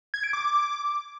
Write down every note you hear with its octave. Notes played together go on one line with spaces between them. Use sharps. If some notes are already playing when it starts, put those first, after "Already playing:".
G#6
D7
D6